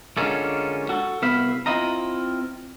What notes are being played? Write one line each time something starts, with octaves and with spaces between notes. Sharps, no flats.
D3 G#3 A#3 C#4 F4 A4
F#4 A4
C2 B3 E5 F5 B5
C4 E4 F4 D#5 A#5